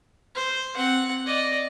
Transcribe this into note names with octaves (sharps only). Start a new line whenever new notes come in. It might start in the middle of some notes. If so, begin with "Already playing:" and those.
C5
C4 F#5
D5 D#5